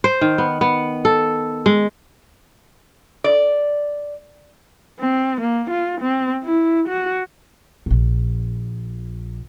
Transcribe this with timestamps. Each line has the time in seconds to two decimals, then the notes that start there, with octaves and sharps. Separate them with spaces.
0.04 C5
0.21 D#3
0.38 B3
0.61 B3
1.05 A4
1.66 G#3
3.24 D5
5.00 C4
5.41 A#3
5.71 F4
6.01 C4
6.44 E4
6.88 F#4
7.86 A#1 A#2